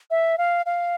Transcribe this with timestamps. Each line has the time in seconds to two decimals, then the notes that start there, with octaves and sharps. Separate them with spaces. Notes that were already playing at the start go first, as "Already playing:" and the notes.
0.10 E5
0.38 F5
0.66 F5